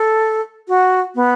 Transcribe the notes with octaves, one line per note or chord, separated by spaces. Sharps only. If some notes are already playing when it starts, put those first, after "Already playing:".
Already playing: A4
F#4
B3